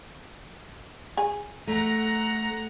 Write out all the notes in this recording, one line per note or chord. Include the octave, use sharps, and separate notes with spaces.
G#4
A3 F#5 A#5